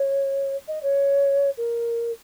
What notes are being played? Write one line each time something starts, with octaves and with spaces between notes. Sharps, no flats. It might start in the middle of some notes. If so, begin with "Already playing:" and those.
Already playing: C#5
D#5
C#5
A#4